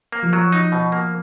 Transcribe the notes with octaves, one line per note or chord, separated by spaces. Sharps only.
A#3
F3
F#3
D#4
B2
A#3